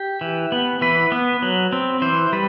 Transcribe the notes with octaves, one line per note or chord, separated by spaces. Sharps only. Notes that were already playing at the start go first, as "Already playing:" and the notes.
Already playing: G4
E3
B3
E3 B4
B3
F#3
C4
E3 C5
G3 B4